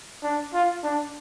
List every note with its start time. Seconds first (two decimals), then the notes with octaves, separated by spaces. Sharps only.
0.23 D4
0.54 F4
0.83 D4